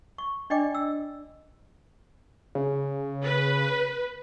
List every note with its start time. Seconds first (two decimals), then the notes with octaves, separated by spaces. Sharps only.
0.18 C#6
0.50 D4 D5 D#5 G5 B5 D6
0.75 E6
2.55 C#3
3.23 B4